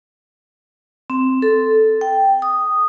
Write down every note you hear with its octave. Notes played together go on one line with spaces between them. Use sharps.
C4
A4
G5
D#6